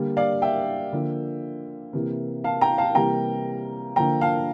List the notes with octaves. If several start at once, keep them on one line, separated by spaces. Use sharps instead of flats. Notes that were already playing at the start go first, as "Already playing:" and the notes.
Already playing: D3 G3 A#3
D5 F5
E5 G5
D3 F3 A#3
C3 E3 A#3
F5 A5
G5 A#5
F5 A5
C3 E3 G3 A#3 G5 A#5
D3 F3 A#3 G5 A#5
F5 A5